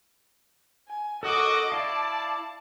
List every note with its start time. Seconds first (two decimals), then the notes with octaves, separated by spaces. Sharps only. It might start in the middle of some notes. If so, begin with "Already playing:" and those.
0.88 G#5
1.23 A#3 C#4 F#4 A4 D#5 D6 D#6
1.72 E4 D5 F5 A5